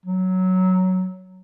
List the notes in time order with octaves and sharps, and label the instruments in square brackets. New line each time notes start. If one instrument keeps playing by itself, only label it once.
[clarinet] F#3